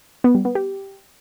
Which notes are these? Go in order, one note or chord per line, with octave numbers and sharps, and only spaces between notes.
B3
G3
B3
G4